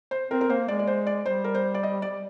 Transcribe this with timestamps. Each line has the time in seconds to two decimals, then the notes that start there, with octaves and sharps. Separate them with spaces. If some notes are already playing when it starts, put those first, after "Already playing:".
0.11 C5
0.31 C4 A#4
0.41 A#4
0.50 A#3 C5
0.68 G#3 D5
0.79 D5
0.87 C5
1.07 D5
1.26 G3 C5
1.44 A#4
1.55 C5
1.74 D5
1.83 D#5
2.02 D5